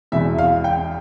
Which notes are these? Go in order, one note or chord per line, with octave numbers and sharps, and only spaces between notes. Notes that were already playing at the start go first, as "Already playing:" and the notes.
E1 E2 B2 E5
F5
G5